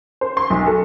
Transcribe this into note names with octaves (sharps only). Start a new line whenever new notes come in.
C5
C6
B1
A4